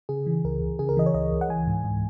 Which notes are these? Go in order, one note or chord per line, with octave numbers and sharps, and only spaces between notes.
C#3 G#4
E3
C#2 A#4
C#2
C#3 G#4
A#4
E3 D#5
C#5
C#2 D#5
C#2
F#5
E3 G#5
G#2
G#2